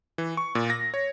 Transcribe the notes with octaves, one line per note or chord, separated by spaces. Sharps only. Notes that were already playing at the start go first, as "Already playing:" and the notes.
E3
C#6
A#2
A#6
C#5